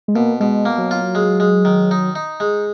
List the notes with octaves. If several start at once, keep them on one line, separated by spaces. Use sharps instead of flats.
G#3
B2 A#3
B2 G#3
A#3
F#3
F4
G#3
G#3
D#3
D#4
D#4
G#3